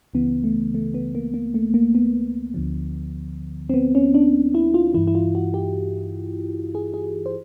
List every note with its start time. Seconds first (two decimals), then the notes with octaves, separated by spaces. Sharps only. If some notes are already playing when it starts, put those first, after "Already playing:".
0.14 C#2 C#3 E3 B3
0.44 A3
0.75 A3
0.94 B3
1.15 A#3
1.34 A#3
1.54 A3
1.74 A#3
1.95 B3
2.54 D2 D3 F3
3.70 C4
3.74 B3
3.95 C#4
4.14 D4
4.55 E4
4.74 F4
4.94 G2 E3 E4
5.07 E4
5.15 F4
5.35 F#4
5.54 G4
6.75 G#4
6.94 G#4
7.26 C5